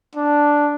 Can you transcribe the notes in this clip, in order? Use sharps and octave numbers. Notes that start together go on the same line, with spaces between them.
D4